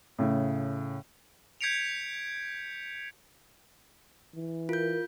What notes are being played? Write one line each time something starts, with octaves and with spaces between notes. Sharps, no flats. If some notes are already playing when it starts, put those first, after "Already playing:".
A2 C#3
G6 G#6 B6 C#7 D7 F7
E3
F4 A#4 G6